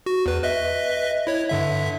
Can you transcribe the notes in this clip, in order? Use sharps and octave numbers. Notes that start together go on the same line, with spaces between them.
F#4
E2 B4
B4 D#5 E5
E4 C#5
G2 D3 E5